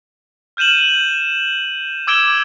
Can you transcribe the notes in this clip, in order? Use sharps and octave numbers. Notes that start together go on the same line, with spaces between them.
F6 G6 D#7 E7 F#7
D6 E6 G#6 D7 E7 G7